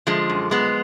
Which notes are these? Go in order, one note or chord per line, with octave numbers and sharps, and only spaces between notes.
D3 F3 G#3
F#2
F3 G#3 B3